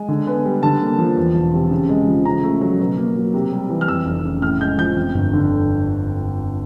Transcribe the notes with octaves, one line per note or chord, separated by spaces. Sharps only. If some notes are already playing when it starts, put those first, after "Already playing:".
Already playing: G#3 G#5
D3
B3
G3
D3 A5
A#3
F3
E2
E1
C3
C#3
G#3
F3
C#3 A#5
A3
F#3
B2
A#3
F#3
C3
G3
E3
F6
F2 E6
F1
C#3
A2 F6
G#3 G6
F3 G6
F2
G1
D3